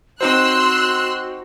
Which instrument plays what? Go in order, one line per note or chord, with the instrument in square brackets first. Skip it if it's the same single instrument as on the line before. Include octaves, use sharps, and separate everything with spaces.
[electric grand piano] C4 D#4 C5 [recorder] F#4 [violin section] C6 E6 F#6